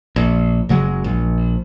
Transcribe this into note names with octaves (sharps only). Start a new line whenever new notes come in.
A#1
F#1 C#3 F#3 G#3
A#1